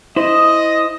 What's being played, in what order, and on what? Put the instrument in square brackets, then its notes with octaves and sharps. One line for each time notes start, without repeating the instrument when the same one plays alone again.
[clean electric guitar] E4 C5 [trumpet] D#5 [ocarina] D#6